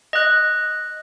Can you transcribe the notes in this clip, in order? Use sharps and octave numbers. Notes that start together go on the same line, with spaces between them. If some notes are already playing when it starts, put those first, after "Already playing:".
D#5 F#6